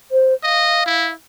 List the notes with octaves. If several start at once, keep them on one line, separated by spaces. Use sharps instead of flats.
C5
D#5 F5
E4